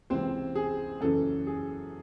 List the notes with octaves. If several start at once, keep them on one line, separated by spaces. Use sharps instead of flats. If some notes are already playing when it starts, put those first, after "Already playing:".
C#2 C3 E3 C4 C5
G#4
F#2 C#3 E3 A4
G#4